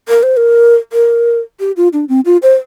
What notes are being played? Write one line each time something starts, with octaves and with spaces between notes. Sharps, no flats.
A#4
C5
A#4
A#4
G4
F4
D4
C4
F4
C5